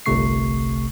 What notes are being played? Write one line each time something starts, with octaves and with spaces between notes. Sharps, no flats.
G1 C2 C3 A3 C#6 C7